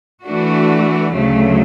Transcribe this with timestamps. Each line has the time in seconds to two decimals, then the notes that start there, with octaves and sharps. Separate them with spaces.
0.24 E3 A3 D4 F#4
1.14 D2 C#3 F#3 A3